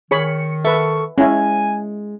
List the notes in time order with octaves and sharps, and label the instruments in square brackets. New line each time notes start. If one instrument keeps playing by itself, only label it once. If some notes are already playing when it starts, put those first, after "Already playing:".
[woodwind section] D#3 [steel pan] G#4 C#5 B5 [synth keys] C#7
[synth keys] A4 C#6 [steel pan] B4 E5
[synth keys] G#3 [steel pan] C#4 E4 [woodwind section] G#5